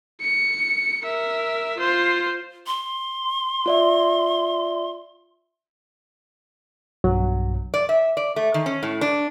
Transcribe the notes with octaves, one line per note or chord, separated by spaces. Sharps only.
C#7
A#4 E5
F4 C5
C6
F4 D5 E5
B1 G2 B2 F#3
D5
E5
D5
A3
D#3
C#4
A2
D4